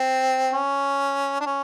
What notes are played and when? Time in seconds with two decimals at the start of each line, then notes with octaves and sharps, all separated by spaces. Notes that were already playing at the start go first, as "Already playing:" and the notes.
Already playing: C4
0.53 C#4
1.41 D4
1.46 C#4